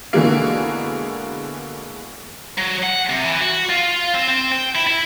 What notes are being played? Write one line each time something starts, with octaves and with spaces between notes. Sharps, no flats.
B2 D3 E3 G#3 A#3
F#3
F#5
C3
E3
F#4
F4
C4
C4
G5
E4
E4